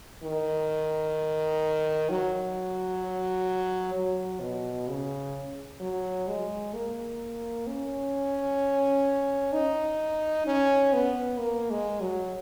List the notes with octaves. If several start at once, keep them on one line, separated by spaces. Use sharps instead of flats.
D#3
F#3
F#3
B2
C#3
F#3
G#3
A#3
C#4
D#4
C#4
B3
A#3
G#3
F#3